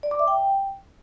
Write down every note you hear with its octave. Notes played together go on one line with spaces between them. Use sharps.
D5
D6
E5
G5